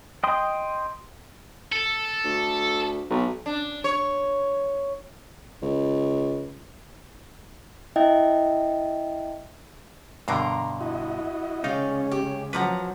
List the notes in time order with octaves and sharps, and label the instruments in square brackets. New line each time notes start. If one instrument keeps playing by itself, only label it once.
[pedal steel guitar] D#5 G5 C6 D#6
[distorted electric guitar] A4
[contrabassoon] D2
B1
[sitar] D4
C#5
[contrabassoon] C#2
[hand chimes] E4 D#5 E5 G5
[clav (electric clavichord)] G2 B2 D3 [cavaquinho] A#4 A#5 C6
[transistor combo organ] E4 F#4 D#5
[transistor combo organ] C#3 G#3 [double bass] C#4 [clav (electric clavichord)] D#4 [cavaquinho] D5 F5 G5
[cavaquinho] G4
[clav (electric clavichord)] F3 B4 [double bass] F#3 [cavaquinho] F#5 A#5 D6